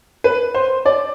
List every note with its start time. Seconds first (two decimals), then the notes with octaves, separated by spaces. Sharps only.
0.24 B4
0.54 C5
0.86 D5